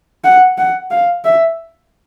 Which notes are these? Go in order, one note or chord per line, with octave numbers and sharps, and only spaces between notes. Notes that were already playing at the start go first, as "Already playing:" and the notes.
F#5
F#5
F5
E5